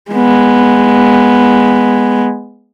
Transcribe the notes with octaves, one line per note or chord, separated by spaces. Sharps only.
G#3 B3